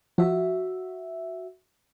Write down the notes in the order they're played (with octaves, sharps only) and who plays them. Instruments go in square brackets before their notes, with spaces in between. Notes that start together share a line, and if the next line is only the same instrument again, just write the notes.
[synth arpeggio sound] F3 [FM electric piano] F#4 E5